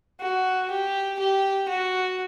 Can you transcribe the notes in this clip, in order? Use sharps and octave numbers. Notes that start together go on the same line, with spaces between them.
F#4
G4
G4
F#4